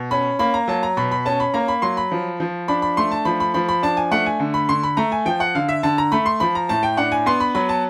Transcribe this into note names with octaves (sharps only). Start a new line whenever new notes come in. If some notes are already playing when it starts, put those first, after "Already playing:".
Already playing: B2
C#4 B5
A#3 B5
A#5
F#3 A5
A#5
B2 B5
B5
C#4 A5
B5
A#3 A#5
B5
F#3 C6
B5
F3
F3
D4 B5
B5
A3 C6
A5
F3 B5
B5
F3 B5
B5
D4 A5
G#5
A3 F#5
G#5
D3
B5
D3 C6
B5
A3 A#5
G#5
F3 G5
F#5
D3 F5
E5
D3 A5
A#5
A3 B5
C6
F3 B5
A#5
A2 A5
G5
D4 F#5
G#5
B3 C6
B5
F#3 B5
A5